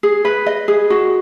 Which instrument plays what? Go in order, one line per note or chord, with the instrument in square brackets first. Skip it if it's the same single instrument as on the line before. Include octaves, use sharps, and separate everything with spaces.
[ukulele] G#4
B4
D#5
G#4
F#4